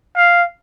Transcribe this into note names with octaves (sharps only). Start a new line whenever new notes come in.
F5